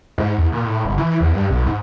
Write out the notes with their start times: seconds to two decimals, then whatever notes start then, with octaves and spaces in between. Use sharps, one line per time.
0.18 G#2
0.38 E2
0.52 A#2
0.64 A2
0.85 G1
0.98 E3
1.21 E2
1.34 G2
1.50 B1
1.67 G#2